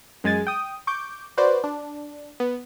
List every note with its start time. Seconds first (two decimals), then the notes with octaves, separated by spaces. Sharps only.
0.24 F#2 G#3 G#5 A6
0.47 G5 D#6
0.87 C#6 D6 G6
1.37 F#4 B4 C5 D5
1.64 D4
2.40 B3